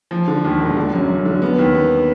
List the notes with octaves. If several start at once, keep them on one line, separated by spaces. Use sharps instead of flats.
F3
D3
D#2
E1
D3
F#2
F#2
D3
B3
D#2
B3